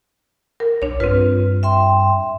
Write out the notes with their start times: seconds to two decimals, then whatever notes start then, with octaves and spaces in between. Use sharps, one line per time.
0.60 A#4
0.82 B1 D4 C#5
1.00 G2 C4 F4 B4
1.63 E5 G5 C6